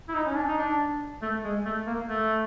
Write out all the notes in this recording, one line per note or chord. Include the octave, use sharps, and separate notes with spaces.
E4
D#4
C#4
D4
D#4
D4
A3
G#3
A3
A#3
A3